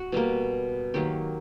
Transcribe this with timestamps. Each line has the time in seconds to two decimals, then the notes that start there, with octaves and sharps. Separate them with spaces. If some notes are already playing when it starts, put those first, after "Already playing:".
Already playing: F#4
0.12 B2 G3 A#3
0.94 D#3 F#3 A#3 G4